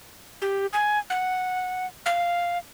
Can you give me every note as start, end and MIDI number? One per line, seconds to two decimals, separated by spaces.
0.42 0.66 67
0.73 0.99 80
1.10 1.86 78
2.06 2.58 77